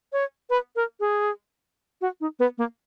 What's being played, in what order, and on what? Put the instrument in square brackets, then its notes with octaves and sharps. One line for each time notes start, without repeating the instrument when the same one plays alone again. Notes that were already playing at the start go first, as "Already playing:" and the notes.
[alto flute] C#5
B4
A#4
G#4
F#4
D#4
B3
A#3